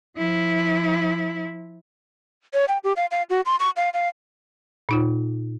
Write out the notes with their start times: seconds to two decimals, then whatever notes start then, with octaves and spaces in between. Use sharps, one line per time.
0.17 F3 E4
2.54 C#5
2.68 G5
2.84 G4
2.97 F5
3.11 F5
3.30 F#4
3.46 C6
3.60 C#6
3.77 F5
3.94 F5
4.89 A#2 D#4 F4